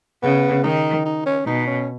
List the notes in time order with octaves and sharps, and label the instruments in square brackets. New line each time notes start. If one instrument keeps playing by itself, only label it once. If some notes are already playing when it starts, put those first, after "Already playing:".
[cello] C#3 [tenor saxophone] B3
[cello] D#3 [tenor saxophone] D#4
[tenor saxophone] D#4
C#4
[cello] B2 [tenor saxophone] D#4
[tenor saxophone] C#4